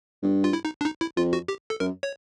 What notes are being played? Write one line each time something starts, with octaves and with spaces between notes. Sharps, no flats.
G2
F4
E4
D#4
D4
D#4
E4
F2 F4
F#4
G4
A4
F#2 A#4
C#5